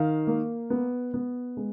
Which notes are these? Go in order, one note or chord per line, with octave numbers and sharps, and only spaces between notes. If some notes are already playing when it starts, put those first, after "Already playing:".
Already playing: D#3 F5
A#3
B3
B3
G#3